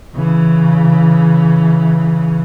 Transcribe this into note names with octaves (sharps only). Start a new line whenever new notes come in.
C#3 E3